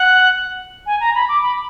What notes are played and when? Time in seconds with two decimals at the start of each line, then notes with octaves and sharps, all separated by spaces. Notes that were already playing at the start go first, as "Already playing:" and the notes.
Already playing: F#5
0.86 G#5
1.00 A#5
1.15 B5
1.29 D6
1.42 B5